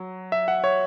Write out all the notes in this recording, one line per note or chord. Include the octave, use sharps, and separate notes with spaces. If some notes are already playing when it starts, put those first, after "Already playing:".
Already playing: F#3
E5
F#5
C#5